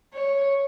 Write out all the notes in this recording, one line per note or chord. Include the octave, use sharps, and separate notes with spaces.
C#5